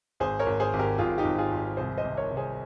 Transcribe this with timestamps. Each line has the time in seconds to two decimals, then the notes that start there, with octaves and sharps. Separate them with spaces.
0.20 G#1 G#4 C5
0.39 A#4 C#5
0.46 G#1
0.60 G#4 C5
0.73 G#1
0.79 G4 A#4
0.98 G#1 F4 G#4
1.18 D#4 G4
1.25 G#1
1.38 F4 G#4
1.51 G#1
1.77 C2 G#4 C5
1.97 C5 D#5
2.04 C3
2.17 A#4 C#5
2.30 C3
2.37 G#4 C5